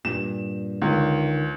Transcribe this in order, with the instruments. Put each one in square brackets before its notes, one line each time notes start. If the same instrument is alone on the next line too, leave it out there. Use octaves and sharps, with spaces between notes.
[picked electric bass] G2 A#2 [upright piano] E7
[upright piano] C#2 [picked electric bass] D3 D#3